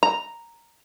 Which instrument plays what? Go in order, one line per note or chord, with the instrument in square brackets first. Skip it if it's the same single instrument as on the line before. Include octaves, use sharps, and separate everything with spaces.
[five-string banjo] A#5